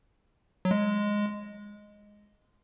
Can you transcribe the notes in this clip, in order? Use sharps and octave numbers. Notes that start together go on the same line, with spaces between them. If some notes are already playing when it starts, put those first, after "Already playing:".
F#3
G#3